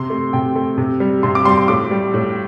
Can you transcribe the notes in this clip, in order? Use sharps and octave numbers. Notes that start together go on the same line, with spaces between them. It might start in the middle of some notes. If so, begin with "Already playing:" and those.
Already playing: C3 C6
A3
C3 G5
A3
C3
G3
C3 C6
D6
G3 C6
C6
A2 D6
G3
A2